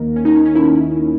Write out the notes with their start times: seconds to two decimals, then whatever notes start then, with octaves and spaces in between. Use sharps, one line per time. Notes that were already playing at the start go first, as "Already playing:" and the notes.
Already playing: D#2 D#3 A#3 A#4
0.16 C#4
0.25 D#4
0.35 C#4
0.46 C#4
0.55 E4